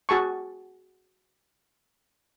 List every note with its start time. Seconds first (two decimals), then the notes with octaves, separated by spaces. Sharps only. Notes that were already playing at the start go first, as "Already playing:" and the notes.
0.09 F#4 G#4 A5 C#6